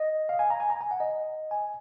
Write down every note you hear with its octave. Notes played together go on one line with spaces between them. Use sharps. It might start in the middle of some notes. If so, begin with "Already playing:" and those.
Already playing: D#5
F5
G#5
A#5
G#5
A#5
G#5
F#5
D#5
G#5